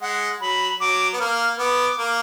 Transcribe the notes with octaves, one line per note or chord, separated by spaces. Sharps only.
G#3 F#5
F#3 B5
F#3 D6
B3
A#3 F6
B3 D6
A#3